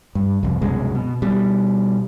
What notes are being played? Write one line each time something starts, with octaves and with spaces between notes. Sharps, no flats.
G2
C2 F2
C2 F#2 B2 G#3
B2
B2 G3